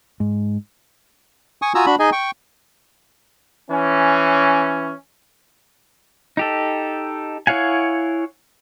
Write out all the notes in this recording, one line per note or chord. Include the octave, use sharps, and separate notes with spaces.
G#2
G#5 C#6 D#6
F4 F#4 G#5 A#5 D#6 E6
D4 F#4 B5
D#4 G#4 D#5 G#5
G5 C#6
E3 C#4
D#4 G4 A4
E4 C#5 F5 F#5 G#5